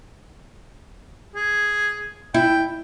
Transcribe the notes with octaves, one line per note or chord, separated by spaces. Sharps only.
G#4
E4 G5